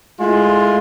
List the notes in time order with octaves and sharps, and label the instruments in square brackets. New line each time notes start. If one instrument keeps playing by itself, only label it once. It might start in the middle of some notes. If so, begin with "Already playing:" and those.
[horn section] G#3 A3 E4 F4